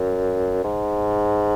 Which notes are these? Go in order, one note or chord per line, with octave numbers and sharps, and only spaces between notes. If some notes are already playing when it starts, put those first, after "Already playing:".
Already playing: F#2
G#2